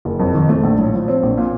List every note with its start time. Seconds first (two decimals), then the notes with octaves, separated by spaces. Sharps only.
0.05 F#1
0.19 F2
0.34 D#3
0.49 A3
0.63 A#1
0.79 A2
0.93 F3
1.08 C4
1.23 A#1
1.37 A#2